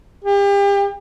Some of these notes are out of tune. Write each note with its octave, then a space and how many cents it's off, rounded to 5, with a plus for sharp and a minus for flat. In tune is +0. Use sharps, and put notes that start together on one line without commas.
G4 +35